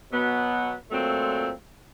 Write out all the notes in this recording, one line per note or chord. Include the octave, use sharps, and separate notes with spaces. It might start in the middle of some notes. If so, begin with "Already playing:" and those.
B2 F#3 B3
A#2 F#3 A3 C4 F4